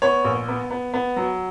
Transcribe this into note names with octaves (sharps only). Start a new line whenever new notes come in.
B3 C#5
A#1
B3
B3
B3
F#3